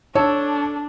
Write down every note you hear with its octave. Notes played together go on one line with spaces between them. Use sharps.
D4 A4 C#5